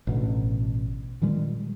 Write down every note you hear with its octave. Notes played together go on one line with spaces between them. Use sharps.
A1 B2 D3
A#2 D#3 G3 G#3